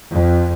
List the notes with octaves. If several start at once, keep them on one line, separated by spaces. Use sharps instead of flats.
F2